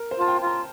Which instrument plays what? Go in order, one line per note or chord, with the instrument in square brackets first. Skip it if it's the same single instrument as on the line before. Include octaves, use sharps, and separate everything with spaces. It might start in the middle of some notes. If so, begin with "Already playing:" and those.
Already playing: [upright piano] A#4
C5
[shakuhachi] F4 [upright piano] A5
[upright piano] G5
[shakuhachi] F4
[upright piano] A#5